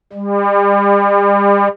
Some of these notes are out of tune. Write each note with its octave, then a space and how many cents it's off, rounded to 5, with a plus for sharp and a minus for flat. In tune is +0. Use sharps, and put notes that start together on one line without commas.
G3 +35